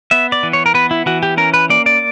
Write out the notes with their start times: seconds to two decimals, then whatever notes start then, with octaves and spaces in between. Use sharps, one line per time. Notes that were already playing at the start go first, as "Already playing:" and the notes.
0.11 B3 E5
0.32 D5
0.43 E3
0.53 C#5
0.66 A#4
0.74 B3 B4
0.91 E4
1.06 E3 F#4
1.23 G4
1.37 C#4 A#4
1.54 B4
1.70 A#3 D5
1.86 D5